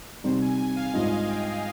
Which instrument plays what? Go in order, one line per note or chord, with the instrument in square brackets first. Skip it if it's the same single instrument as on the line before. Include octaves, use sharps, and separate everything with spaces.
[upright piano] C3 G3 C4 D#4 [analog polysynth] C5
[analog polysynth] G#5
G#5
F5
[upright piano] G#2 G3 D4 F4 [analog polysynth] D#5
[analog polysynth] G5